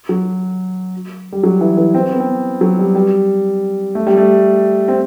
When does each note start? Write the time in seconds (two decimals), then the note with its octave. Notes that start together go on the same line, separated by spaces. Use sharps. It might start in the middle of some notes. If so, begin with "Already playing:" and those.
0.09 F#3
1.32 G3
1.43 F#3
1.61 E3
1.77 E3
1.94 C4
2.13 B3
2.20 C4
2.61 F#3
2.79 G3
2.95 G3
3.95 A3
4.07 G3
4.17 A3
4.88 C4